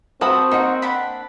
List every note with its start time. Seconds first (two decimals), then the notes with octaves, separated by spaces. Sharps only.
0.21 C4 F#4 A5 B5 D#6
0.51 A#3 D#4 F#4
0.82 D4 F#5 B5